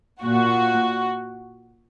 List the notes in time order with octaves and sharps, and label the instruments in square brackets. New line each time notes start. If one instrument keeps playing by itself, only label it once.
[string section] A#2 F#4